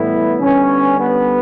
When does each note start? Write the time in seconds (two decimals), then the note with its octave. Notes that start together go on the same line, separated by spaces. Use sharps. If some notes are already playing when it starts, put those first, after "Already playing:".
Already playing: A2 E3 G3 B3 E4
0.38 D3 G3 B3 C#4
0.98 B3